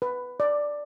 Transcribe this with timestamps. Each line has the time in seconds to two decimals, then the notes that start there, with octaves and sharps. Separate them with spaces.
0.02 B4
0.40 D5